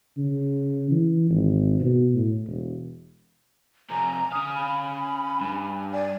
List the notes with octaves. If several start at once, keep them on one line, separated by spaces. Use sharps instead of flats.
C#3
E3
G#1
B2
A2
E1
F2 C3 G#5 A#5
C#4 F5 D#6
B5
G2
D5 G#5